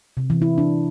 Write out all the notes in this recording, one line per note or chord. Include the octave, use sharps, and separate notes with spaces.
C3
E3
E4
D4